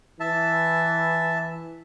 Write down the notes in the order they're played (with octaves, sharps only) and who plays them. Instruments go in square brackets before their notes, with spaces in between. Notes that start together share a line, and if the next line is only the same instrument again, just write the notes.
[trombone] E3 [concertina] E5 A5